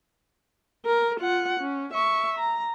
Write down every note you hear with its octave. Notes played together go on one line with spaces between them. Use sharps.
A#4
F4 F#5
C#4
E5 C#6
A#5